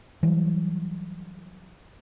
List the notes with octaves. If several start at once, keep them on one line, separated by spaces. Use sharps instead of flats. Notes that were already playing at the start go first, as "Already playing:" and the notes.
E3 F#3 G3